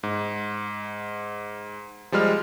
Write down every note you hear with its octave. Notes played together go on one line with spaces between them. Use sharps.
G#2
F3 G3 G#3 F6